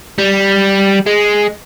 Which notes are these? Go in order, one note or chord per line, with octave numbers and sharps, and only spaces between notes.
G3
G#3